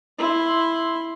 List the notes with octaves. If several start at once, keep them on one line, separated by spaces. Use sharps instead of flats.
E4 C6